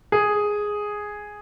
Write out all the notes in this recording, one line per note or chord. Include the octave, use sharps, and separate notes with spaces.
G#4